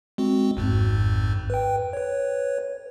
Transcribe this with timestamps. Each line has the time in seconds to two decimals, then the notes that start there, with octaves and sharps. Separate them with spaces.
0.18 G#3 C4 F#4
0.57 G#1 F2 G#2
1.50 B4 G5
1.93 B4 C#5